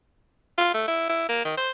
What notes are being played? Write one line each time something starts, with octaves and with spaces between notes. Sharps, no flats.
F4
A3
E4
E4
A#3
D#3
C5